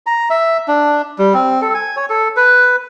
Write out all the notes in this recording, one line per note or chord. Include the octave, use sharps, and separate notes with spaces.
A#5
E5
D4
G3
C4
A4
G#5
C#5
A4
B4